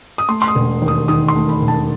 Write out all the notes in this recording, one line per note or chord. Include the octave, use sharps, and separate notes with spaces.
D#6
A3 C6
C6
D#6
E1
D#2
D#6
D#3 D#6
C6
A3
B5
E1
A5